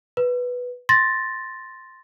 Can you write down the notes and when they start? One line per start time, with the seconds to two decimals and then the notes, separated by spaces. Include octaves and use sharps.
0.17 B4
0.89 C6 A6 A#6